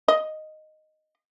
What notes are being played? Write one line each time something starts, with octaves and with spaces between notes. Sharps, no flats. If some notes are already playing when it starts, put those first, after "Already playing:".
D#5